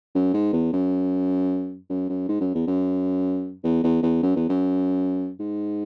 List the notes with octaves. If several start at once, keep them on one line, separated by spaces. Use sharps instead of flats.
F#2
G#2
E2
F#2
F#2
F#2
G#2
F#2
E2
F#2
E2
E2
E2
F#2
E2
F#2
G#2